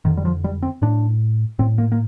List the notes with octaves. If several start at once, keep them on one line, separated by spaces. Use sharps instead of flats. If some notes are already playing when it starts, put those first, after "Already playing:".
F2 D3 D#3
G3
F3
G3
C4
A2 D4
A2 C4
A#3
A#3